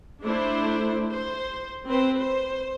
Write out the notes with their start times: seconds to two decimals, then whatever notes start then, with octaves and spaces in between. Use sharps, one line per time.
0.23 A3 D4 E4 C5
1.09 C5
1.88 C4 B4 C5
2.19 C5